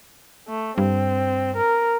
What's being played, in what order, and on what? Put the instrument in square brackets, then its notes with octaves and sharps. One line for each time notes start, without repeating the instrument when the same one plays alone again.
[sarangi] A3
[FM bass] G2 [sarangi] C4
[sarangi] A#4